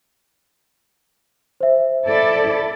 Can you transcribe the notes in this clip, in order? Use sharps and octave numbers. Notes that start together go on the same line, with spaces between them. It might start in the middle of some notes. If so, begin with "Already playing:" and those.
C5 E5
E4 A4 D5